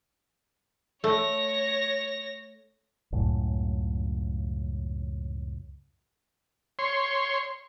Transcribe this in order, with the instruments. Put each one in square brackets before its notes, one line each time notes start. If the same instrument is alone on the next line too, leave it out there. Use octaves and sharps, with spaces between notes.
[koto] A3 [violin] C#5 A#6
[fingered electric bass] C#2 F#2 A2 C#3
[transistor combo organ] C#5 C6